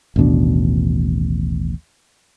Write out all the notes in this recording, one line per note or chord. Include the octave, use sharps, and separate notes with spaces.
A1 D#2 B2 D4